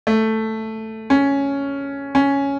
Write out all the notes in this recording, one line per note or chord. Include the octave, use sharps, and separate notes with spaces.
A3
C#4
C#4